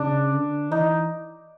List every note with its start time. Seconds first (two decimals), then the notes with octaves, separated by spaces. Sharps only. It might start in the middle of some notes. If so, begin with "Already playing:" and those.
Already playing: C#3 D4
0.33 D3
0.71 E3 D#4